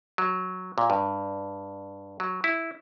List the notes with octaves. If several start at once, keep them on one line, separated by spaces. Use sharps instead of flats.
F#3
A#2
G2
F#3
E4